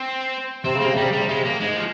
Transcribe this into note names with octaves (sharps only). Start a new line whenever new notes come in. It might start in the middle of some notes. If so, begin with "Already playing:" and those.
Already playing: C4
C3 C4
C#3
C3 A#3
C#3
C3 G3
C#3 G3
C3
C#3 G#3
C3
A#3
G#2 G#3
F3